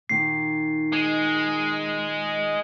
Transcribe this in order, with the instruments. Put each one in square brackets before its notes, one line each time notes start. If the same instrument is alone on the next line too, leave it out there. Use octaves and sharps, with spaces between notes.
[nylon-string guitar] A#2 D#3 [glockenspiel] C7
[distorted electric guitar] G#3